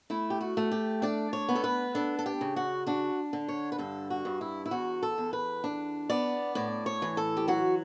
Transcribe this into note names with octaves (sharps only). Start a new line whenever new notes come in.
A3 E4
G4
F#4
A3
G4
D4 D5
C#5
B3
A4
B4
D4 A4
A4
G4
C#3
F#4
D4 F#4
D3
C#5
B4
G2 A4
F#4
G2
E4
E4
E2 F#4
A4
E2
B4
D4
B3 D5
A2 D5
C#5
E3
A4
G4
F#3 F#4